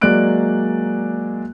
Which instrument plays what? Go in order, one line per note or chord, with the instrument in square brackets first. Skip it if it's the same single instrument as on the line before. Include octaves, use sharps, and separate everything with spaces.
[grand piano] F#3 G#3 A#3 D5 F#6 D7